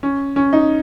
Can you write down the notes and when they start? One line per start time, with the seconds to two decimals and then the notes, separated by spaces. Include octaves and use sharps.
0.03 C#4
0.36 C#4
0.53 D#4